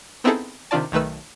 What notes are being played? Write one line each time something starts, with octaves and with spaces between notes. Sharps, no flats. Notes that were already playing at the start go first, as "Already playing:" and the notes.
B3 C4 D#4 E4 G#4 A4
C3 D#3 D4 F4 D5 A5
B1 D#3 A3 B4 E6